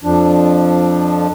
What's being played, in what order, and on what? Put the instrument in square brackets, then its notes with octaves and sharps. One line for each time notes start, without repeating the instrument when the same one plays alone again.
[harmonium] F2 F3 D4